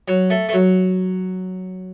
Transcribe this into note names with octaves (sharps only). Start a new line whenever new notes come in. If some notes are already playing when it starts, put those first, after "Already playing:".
F#3
A3
A3
F#3